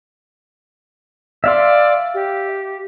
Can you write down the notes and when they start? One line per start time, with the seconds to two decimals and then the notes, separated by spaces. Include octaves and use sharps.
1.44 D5 E5 F5 C6
2.14 G4